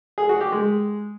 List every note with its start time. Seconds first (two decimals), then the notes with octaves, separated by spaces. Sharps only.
0.18 G#4
0.29 F#4
0.41 G4
0.52 G#3